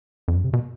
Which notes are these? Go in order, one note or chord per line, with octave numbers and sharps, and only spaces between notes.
F2
F#2
C3
B2